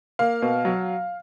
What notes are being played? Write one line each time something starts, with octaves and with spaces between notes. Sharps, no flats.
A#3 F5
B2
F#3